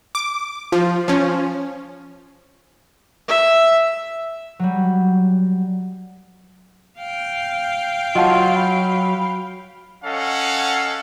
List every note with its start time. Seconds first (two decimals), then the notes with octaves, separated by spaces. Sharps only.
0.15 D6
0.72 F3
1.08 F3 C#4
3.28 E5
4.59 F#3 G3
6.99 F5 G5
8.16 F#3 F4 D#5 F#5 A5
8.56 B5
10.04 C#4 A4 D#5 F5 F#5